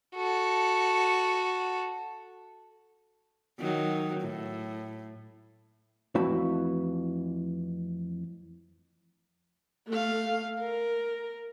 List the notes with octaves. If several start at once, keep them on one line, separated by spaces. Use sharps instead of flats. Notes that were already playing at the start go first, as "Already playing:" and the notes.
F#4 A4
D#3 F#3
A2
F2 E3 A3 F#4 A5 B5
A3 F5
A#4